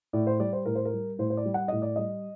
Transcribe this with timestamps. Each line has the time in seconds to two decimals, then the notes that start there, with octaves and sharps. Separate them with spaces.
0.13 A2 D5
0.27 C5
0.40 G3 D5
0.53 C5
0.66 A2 A#4
0.75 C5
0.85 A#4
0.93 G3
1.19 A2 C5
1.30 C5
1.37 D5
1.46 G3
1.54 F#5
1.68 A2 D#5
1.82 D5
1.96 G3 D#5